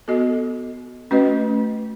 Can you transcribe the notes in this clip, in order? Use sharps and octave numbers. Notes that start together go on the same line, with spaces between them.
B3 F#4 A4 D#5
A3 C#4 F#4 B4 D#5